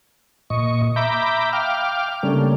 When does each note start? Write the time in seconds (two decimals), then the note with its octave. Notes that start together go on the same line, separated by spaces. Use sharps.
0.50 A#2 D#5 C#6
0.96 E5 A#5 B5 D6 G6
1.53 F5 G5 D6 F6
2.23 C#3 G3 A3 A#3 C#4 D4